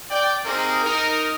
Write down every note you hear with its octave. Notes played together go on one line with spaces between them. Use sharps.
D5 G5
A#3 C4 D#4 G4 G#4 A#4
D#4 A#4